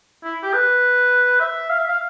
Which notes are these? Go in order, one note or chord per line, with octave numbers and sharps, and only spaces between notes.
E4
G4
B4
E5
F5
E5
F5